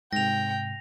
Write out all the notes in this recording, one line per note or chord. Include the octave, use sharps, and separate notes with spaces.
G#2 C3 G5 A#6 F7